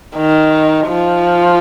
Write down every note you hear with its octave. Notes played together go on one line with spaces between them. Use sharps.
D#3
F3